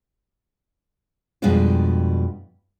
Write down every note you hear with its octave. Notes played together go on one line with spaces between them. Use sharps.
F2 B2 G3 G#3 D4 F4